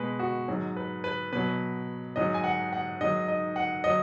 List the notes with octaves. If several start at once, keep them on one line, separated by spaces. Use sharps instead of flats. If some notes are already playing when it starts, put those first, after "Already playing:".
Already playing: B2 G#3 B4
F#4
G#2 F#3
B4
B4
B2 F#3 B4
G#2 F#3 D#5
G#5
F#5
F#5
G#2 D#3 F#3 D#5
D#5
F#5
F#3 D#5